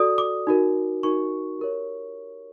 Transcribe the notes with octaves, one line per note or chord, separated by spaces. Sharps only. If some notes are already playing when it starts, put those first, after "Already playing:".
Already playing: F#4 A4 D5 D#6
D6
D#4 F#4 A#4
D#4 F#4 A#4 C#6
G4 A#4 C#5